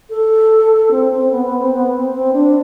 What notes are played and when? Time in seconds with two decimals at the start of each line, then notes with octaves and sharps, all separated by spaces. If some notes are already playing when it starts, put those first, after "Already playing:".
0.10 A4
0.91 C4
1.12 C4
1.31 B3
1.46 B3
1.59 C4
1.73 B3
1.93 C4
2.13 C4
2.33 D4